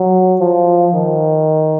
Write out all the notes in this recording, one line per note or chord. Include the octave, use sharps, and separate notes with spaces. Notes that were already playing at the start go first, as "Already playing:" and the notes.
Already playing: F#3
F3
D#3